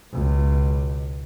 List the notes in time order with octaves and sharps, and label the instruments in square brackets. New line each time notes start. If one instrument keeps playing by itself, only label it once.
[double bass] C#2 B2